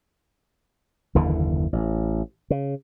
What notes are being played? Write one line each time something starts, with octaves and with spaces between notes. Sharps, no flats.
F#1 D#2 D3 E3
A1
C#3